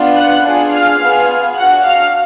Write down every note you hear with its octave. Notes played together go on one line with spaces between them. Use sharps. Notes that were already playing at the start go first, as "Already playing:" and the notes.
Already playing: B3 D4 F4
F#5 F#6
D4 F4 G#4
F5 F6
B3 F4 G#4
D4 F#4 F#5 F#6
F5 F6